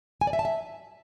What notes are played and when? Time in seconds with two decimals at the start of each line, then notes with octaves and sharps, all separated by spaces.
0.21 G#5
0.27 D5
0.33 E5
0.39 A5
0.45 E5